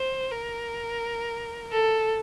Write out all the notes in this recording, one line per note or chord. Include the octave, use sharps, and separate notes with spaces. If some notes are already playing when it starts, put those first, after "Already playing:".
Already playing: C5
A#4
A4